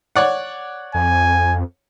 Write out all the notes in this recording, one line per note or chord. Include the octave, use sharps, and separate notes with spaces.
C#5 D5 F#5
F2 G#5